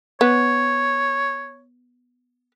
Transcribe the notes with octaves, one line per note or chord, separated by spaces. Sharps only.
B3 C#5